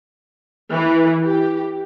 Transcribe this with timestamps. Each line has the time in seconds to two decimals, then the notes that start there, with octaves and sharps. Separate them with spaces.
0.73 E3
1.21 G4